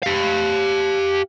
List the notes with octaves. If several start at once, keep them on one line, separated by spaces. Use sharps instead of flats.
G4 F5